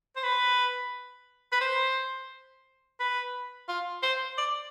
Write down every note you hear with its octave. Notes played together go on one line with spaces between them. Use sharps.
C5
B4
B4
C5
B4
F4
C5
D5